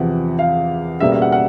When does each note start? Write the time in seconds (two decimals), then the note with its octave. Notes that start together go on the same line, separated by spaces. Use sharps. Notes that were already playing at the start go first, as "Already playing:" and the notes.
Already playing: E2 C3 F3 F#5
0.39 F5
1.00 C#2 B2 G3 A#3 E5
1.12 E5
1.22 F#5
1.32 F#5